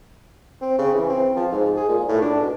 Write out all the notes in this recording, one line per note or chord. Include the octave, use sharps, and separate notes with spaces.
C4
C#3
E3
C4
F3
G#2
G#4
A#2
A2
D4
B2